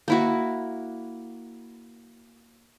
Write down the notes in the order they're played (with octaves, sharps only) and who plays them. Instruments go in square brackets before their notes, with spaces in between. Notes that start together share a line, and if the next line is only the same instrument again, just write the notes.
[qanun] A#3 E4 F#4